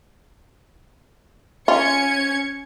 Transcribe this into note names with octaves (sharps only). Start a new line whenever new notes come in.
C#4 F4 G#6 C#7